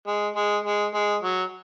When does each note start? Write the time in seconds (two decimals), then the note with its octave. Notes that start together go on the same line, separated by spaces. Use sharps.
0.07 G#3
0.36 G#3
0.64 G#3
0.94 G#3
1.22 F#3